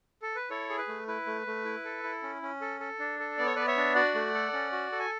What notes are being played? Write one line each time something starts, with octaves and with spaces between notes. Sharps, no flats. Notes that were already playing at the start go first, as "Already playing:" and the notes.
A4
B4
E4 A4 C#5
G#4
B4
A3
E4 B4
A3
A3
E4
A4
E4
C#4
C#4
A4
A4
D4
A4
B3 D5
C#5
B3 B4 D5
C#5 E5
D4
F#4 D5 F#5
A3
A4
C#4
F#4
A4
G#5